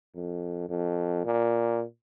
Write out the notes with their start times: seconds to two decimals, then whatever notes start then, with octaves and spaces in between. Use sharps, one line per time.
0.15 F2
0.69 F2
1.25 A#2